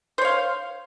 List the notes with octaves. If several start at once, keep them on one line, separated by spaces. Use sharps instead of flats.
C5 C#5 F5